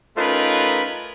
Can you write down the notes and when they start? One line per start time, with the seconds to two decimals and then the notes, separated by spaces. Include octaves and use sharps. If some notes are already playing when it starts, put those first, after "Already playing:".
0.17 A3 C#4 D#4 F4 A#4 B4